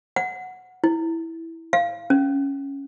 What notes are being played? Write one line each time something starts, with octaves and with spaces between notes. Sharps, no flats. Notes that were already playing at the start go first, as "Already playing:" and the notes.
F#5
E4
F5
C#4